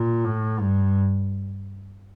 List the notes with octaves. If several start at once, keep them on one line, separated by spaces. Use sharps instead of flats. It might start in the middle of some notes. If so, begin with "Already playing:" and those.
Already playing: A#2
A2
G2